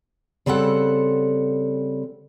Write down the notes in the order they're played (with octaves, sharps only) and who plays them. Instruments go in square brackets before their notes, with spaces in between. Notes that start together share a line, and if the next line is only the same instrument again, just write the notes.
[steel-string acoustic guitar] C#3 G3 C4 A4 F#5